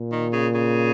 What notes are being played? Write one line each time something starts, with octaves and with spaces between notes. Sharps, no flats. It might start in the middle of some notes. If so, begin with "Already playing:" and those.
Already playing: A#2
D#3
C#3
C#3